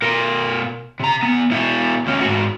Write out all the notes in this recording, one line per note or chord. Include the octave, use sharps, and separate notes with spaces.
B2 A#4
C3 A#5
E2 B3
B2 E4
D2 C#4
G#2 F#4